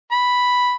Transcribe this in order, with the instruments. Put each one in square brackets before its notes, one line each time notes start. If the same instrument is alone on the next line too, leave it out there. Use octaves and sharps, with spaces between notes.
[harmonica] B5